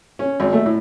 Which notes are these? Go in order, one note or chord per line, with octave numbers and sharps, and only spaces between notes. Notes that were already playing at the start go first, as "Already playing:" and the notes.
C#4
G#1
A3
A2